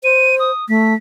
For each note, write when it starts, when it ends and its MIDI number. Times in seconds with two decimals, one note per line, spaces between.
0.04 0.51 72
0.04 0.35 99
0.39 0.67 87
0.69 0.94 57
0.69 0.93 95